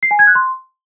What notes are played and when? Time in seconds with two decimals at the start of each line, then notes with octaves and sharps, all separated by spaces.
0.03 C7
0.11 G#5
0.19 G#6
0.27 F#6
0.35 C6